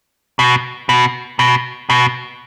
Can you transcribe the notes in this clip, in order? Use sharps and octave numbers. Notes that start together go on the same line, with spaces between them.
B2
B2
B2
B2